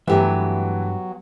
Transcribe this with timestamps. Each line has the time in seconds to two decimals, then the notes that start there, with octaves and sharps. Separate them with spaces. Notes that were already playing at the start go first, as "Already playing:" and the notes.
0.07 G2 B2 E3 F#3 A3 B3 G4 E5